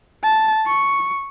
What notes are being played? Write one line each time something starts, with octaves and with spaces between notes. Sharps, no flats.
A5
C#6